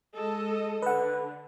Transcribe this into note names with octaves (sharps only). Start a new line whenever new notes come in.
G#3 A4 D#5
D3 B4 F#5